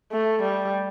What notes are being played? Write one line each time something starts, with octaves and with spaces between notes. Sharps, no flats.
A3
G3